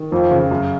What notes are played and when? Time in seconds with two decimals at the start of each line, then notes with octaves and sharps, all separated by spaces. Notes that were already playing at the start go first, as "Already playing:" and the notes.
Already playing: D#3
0.12 F2 F3
0.31 C#3
0.51 F#2